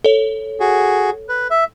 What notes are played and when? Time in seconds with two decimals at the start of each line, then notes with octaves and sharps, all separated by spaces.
0.04 A4 C#5
0.60 F#4 G#4
1.29 B4
1.50 E5